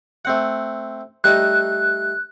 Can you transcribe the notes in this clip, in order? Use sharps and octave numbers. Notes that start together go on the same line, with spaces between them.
A3 C4 F#5
G3 A3 D#4 F#6